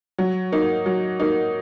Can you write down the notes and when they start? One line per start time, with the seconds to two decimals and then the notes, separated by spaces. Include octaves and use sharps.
0.18 F#3
0.52 A#3 D#4
0.86 F#3
1.20 A#3 D#4